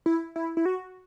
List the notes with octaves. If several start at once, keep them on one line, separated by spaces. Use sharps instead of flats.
E4
E4
E4
F#4